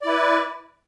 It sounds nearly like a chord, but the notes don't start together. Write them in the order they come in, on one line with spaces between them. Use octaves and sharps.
D5 E4 B4